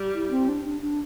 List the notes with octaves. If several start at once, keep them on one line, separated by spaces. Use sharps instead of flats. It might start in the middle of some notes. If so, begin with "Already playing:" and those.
Already playing: G3
E4
C4
D4
D4
D4